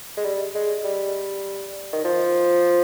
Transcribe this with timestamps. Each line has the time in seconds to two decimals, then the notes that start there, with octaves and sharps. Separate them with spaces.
0.17 G#3
0.24 G3
0.55 G#3
0.84 G3
1.93 D#3
2.04 F3